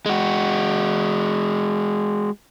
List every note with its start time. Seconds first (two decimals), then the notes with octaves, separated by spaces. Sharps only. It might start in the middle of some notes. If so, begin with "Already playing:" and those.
0.06 G#3 F#4